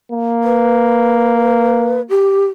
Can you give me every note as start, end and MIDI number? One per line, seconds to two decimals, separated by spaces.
0.12 2.08 58
0.44 2.02 71
2.10 2.45 67